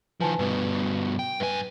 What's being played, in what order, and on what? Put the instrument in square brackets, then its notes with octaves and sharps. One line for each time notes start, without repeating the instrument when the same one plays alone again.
[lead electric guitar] D#3 F3 [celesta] B4 G#5 A5
[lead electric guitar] G2 B2 [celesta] B4
[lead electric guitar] G5
[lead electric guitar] G2 G#5 [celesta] B4